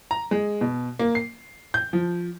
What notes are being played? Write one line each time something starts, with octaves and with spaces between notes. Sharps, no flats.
A#5
G#3
B2
A#3
C7
G6
F3